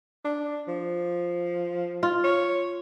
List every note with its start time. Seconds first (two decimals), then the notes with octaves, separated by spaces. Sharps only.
0.25 D4
0.68 F3
2.03 F4
2.24 C#5